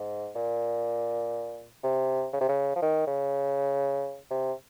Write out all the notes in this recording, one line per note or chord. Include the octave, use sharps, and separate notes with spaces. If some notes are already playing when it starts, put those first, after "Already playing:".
Already playing: G#2
A#2
C3
C#3
C3
C#3
F3
D#3
C#3
C3